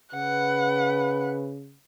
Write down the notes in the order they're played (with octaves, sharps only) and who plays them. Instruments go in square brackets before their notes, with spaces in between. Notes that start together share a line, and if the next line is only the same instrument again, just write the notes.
[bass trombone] C#3 [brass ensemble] B4 [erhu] F#5